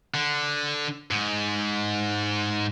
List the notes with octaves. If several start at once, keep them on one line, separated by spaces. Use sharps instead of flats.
D3
G#2